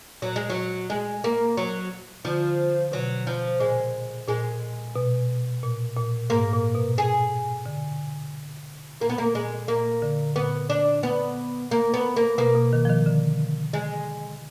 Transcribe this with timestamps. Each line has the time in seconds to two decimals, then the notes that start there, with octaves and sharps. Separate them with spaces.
0.22 A#2 F#3
0.36 G#3
0.49 F#3
0.90 G#3
1.24 A#3
1.57 F#3
2.25 D3 F3
2.92 B2 F#3
3.27 F3
3.60 A#2 G#3
4.28 A#2 G#3
4.96 B2
5.63 A#2
5.97 A#2
6.30 G#2 A#3
6.53 A#2
6.75 B2
6.98 G#4
7.66 D3
9.01 A#2 A#3
9.09 B3
9.18 A#3
9.35 A#2 G#3
9.68 A#2 A#3
10.02 D3
10.36 A#2 B3
10.70 D4
11.03 B3
11.71 A#3
11.94 B3
12.16 A#3
12.38 B2 A#3
12.55 B2
12.73 D#3
12.85 F3
12.89 D#3
13.06 D3
13.73 G#3